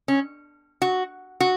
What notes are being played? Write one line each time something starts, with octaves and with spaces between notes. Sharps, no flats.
C#4
F#4
F#4